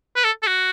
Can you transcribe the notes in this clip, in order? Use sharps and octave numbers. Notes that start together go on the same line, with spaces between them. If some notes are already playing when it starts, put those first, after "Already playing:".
B4
A4
A4
F#4